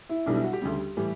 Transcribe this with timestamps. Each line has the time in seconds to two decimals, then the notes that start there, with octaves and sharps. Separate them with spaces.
0.09 E4
0.26 B1 B2 G3 D4
0.35 E4
0.44 F#4
0.53 G4
0.62 D2 C#3 G3
0.97 A2 E3 G3